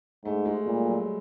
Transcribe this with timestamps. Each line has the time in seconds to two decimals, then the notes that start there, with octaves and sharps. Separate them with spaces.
0.24 G#2 A3
0.45 G#3
0.66 A#2 G3
0.86 F#3